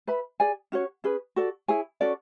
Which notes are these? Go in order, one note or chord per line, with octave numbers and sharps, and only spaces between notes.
B4 E5 B5
G#4 D5 G#5
C#4 F#4 C#5
C#4 G#4 B4
F#4 A4 D5
E4 G#4 C#5 G#5
C#4 F#4 A4 D5